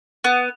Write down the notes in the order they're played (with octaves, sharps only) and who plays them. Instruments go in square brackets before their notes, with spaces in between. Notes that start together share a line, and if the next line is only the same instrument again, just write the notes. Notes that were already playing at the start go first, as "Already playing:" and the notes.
[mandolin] B3